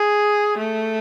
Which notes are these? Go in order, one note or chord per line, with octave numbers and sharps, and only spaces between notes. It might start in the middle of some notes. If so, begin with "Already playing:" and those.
Already playing: G#4
A3